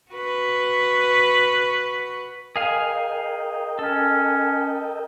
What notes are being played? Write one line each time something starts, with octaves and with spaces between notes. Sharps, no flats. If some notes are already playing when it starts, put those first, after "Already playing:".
F#4 B4
G#4 A#4 D#5 F5 G5 G#5
C#4 A4